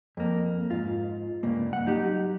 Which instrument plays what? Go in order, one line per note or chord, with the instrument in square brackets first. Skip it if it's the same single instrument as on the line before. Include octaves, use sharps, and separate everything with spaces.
[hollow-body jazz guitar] F2 A#3
G#2 F4
C#2 G2 A#3
F#5
F#3 D#4 G4